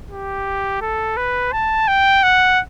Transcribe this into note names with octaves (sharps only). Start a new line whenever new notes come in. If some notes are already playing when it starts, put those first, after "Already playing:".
G4
A4
B4
A5
G5
F#5